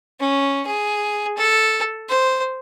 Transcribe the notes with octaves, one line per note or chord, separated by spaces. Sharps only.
C#4
G#4
A4
C5